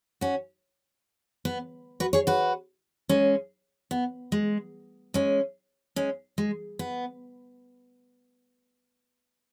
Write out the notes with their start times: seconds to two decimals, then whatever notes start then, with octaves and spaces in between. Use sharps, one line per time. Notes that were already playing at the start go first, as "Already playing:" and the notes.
0.21 C#4 F#4
1.45 B3
2.00 F#4 B4
2.13 G#4 C#5
2.27 F#4 B4
3.09 G#3 C#4
3.91 B3
4.32 G#3
5.14 G#3 C#4
5.96 G#3 C#4
6.38 G#3
6.79 B3